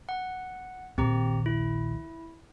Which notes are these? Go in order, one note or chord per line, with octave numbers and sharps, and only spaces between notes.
F#5
A#1 D#2 C4 G4 A#5
E4